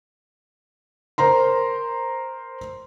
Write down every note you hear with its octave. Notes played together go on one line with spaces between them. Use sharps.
A#4 C5 A#5 C6